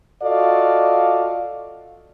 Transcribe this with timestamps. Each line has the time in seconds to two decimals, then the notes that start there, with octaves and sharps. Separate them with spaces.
0.23 F4 F#4 A4 D5 D#5 F5